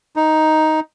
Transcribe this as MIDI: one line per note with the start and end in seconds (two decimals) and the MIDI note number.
0.16 0.80 63